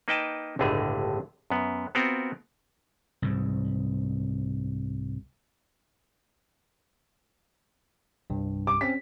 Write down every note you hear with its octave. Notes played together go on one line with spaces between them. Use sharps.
A#3 D#4 B4 D#5 G5 A5
G1 C#2 A2 D3 A3 G#4
F#2 B3
B3 C4 F4 F#4 A#4 G5
C2 G#2
C2 G2
D6
C4 C#4 B6